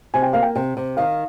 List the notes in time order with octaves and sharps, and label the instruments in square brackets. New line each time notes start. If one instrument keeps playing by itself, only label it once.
[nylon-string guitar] C3 [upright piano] G#5
[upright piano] G5
[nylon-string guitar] A#3 [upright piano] F5
[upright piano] G5
[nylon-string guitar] C3 [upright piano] G5
[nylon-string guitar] C3
[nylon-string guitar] D#3 [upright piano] F5